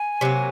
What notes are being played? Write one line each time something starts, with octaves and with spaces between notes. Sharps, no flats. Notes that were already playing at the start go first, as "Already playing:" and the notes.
Already playing: G#5
C3 F#3 A#3